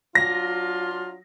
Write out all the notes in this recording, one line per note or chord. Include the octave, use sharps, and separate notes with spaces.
F#3 D4 F4 A#6